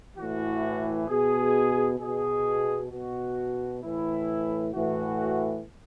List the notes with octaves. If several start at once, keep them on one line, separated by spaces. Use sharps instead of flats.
A2 E3 F#4
B2 G#4
B2 G#4
B2 F#4
A2 E3 E4
A2 E3 F#4